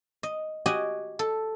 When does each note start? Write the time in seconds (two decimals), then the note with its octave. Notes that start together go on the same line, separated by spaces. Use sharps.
0.23 D#5
0.66 F#4 G4 D#5 G5 G#5
1.19 A4